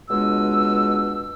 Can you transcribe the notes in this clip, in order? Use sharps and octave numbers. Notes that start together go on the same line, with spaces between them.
C#2 B2 G#3 D4 E6